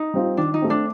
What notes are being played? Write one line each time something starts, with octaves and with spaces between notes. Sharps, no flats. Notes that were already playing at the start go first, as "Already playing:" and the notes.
Already playing: D#4
G3 C4 F4
D#3 D4
D#4
A3 C4
D4